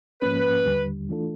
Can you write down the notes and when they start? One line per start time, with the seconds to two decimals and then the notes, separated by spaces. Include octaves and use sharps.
0.22 G#2 F3 A#3 C#4 B4
0.66 D#2 D3 G3
1.09 E3 A3 D4 F4 A4